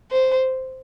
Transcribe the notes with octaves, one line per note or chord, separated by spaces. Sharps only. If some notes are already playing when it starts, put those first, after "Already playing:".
C5